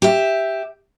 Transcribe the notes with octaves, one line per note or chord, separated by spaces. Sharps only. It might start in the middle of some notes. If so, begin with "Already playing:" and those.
G4 E5